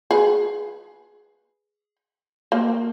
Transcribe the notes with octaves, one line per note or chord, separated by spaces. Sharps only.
G#4 B4
A#3